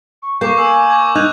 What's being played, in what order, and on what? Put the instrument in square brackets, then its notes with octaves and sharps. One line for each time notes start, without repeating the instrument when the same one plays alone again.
[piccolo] C#6
[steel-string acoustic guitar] A#3 A#4 [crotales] C#6 D6 G6 [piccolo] C7
[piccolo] G#5 [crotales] C#6 E6
[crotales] C#6 D6 G#6
[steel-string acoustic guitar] D#4 [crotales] F#6 G#6 F7